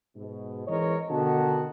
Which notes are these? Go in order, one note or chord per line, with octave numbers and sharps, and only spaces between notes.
G#2 B2
E3 G#3 C4 A#4 C#5 D#5
B2 D3 D#3 D#4 F#4 A5